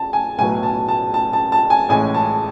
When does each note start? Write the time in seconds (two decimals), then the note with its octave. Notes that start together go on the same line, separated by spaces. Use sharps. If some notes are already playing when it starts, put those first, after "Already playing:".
Already playing: A5
0.13 G#5
0.38 B1 A2 F#3 B3 G#5
0.63 A5
0.88 A5
1.14 A5
1.33 A5
1.52 A5
1.70 G#5
1.89 A1 A2 G#3 G#5
2.14 A5